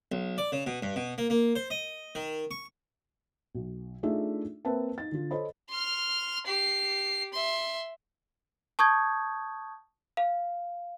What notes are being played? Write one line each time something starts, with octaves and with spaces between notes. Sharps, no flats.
B1
D5
C#3
B2
G2
B2
A#3
A#3
C5
D#5
D#3
C#6
B1
A3 D4 D#4 F4 G#4 E5
A#3 C4 A#4 B4 E5 A5
D#4 A6
D3 F4
A4 C5 C#5 D#5 B5
C6 F6
G4 C7
E5 C6
A5 C#6 D#6 G6 G#6
F5